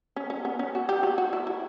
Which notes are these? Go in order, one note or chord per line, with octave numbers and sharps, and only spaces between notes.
C#4
C#4
B3
C#4
F#4
G4
F#4
F#4
E4
E4